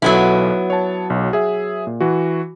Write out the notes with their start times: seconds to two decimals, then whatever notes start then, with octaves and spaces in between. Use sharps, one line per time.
0.02 B1 F#3 B3 E4 A4
0.70 C#5 A5
1.10 B1
1.33 G#4 E5
1.87 A#2
2.00 E3 F#4